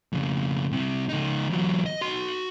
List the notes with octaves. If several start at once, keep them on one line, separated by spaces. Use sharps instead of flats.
F2 C#3
C2 C3
C#2 D#4
E2 F#3
D#5
F#4 C6